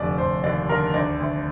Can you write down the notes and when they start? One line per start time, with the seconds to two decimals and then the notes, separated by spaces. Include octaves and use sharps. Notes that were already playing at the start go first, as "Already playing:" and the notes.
Already playing: F1 D3 D5
0.18 F1 C5
0.44 D#2 D5
0.69 D3 A#4
0.94 D2 D5
1.20 D2